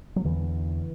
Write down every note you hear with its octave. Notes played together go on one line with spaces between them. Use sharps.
F#3
E2 D3 E3